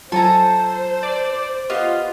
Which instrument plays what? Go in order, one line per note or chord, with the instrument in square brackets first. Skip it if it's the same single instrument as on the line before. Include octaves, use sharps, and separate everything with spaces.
[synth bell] F#3 F4 [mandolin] A4 G#5 A#5 [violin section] C5
[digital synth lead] D5
[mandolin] B3 [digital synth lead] F4 [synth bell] G4 D#5 F7